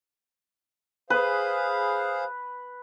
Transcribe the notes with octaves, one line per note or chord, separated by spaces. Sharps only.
G#4 B4 C5 F5